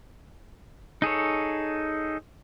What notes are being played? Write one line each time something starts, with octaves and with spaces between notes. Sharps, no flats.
D#4 G#4 A4 C#5